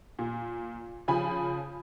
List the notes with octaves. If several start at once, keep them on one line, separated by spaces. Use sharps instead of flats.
A#2
C#3 F3 G#5 B5